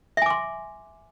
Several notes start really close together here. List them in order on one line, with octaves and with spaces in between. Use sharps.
E5 G#5 D6 C6